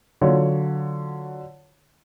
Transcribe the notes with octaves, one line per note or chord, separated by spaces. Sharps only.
D3 F#3 F4 C#5